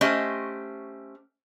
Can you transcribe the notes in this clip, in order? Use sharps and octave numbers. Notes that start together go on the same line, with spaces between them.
A3 C#4 G4 C5 D#5